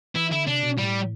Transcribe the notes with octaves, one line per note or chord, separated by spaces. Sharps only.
E3 E4
D3 E4
C3 D4
B2
A2 G3